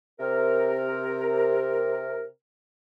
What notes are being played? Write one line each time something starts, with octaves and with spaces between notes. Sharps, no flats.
C3 A#4